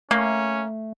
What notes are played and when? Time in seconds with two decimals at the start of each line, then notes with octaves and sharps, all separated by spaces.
0.11 A3 A#3 C#4